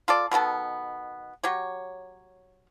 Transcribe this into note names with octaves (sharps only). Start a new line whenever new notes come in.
F4 A4 D5
B2 D#3 B3 A4
F#3 G4 C#5